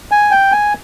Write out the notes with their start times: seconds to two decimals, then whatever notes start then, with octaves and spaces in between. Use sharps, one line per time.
0.11 G#5
0.31 G5
0.52 G#5